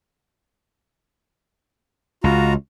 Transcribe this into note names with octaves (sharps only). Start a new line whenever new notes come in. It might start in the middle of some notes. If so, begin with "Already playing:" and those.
C#2 F4 F#4 A#5